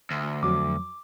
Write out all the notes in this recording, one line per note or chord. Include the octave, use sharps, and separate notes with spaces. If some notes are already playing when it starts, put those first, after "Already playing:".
D2
F2 F#3 D6